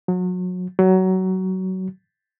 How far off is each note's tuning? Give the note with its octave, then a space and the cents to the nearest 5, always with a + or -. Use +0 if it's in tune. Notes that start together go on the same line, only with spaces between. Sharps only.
F#3 -30
F#3 +20